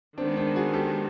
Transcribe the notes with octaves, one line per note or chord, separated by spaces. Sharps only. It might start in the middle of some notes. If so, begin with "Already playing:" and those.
D#3 G#3 B3 C4 D4
C4 D4
F#4 G#4
G4 A4